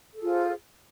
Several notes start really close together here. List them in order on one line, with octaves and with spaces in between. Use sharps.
A4 G#4 F4 C5